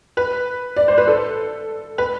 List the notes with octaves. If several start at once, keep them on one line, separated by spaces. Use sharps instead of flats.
B4
D5
C5
B4
A4
B4